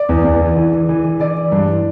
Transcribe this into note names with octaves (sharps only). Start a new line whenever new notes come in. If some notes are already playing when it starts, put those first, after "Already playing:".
Already playing: D5
E2
E2
E3
E3
E3
E3
E3
E3 D5
E3
G2